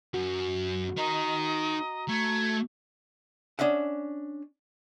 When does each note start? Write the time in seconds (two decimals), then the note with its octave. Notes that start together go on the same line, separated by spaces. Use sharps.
0.14 F#2 F#4
0.98 D#4 A#4 D#5 A#5
2.08 A3 G#6
3.59 C#4 D4 D#5 E5 F#5